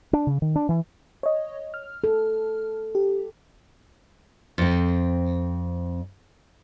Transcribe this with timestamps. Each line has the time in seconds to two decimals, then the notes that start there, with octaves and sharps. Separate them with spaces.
0.13 D4
0.27 C#3
0.42 D#3
0.56 D4
0.69 E3
1.23 C#5 D#5
1.74 F6
2.04 A4
2.95 G4
4.58 F2 C4